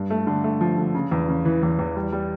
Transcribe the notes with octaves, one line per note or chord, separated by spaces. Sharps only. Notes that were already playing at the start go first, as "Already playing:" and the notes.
Already playing: G2
A3
D3
A3
F3
D3
C#3
E2
C#3
E3
E2
E2
G3
G3